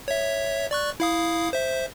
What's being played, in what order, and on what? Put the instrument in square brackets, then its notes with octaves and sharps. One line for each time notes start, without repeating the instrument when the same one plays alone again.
[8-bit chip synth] C#5 E5
D5 C#6 F#6
E4 F5 D#6
C5 E5